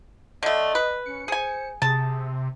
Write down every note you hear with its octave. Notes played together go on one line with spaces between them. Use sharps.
D3 A3 D#5
B4
C#4 C#7
G#4 C5 G#5
C3 G#4 A5